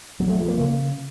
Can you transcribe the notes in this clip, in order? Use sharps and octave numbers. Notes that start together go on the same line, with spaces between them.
F#3
A3
F3
A#3
C#3